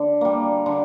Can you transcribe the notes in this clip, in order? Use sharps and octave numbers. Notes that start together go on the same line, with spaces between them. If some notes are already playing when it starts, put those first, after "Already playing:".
Already playing: D3
G3 A#3
D3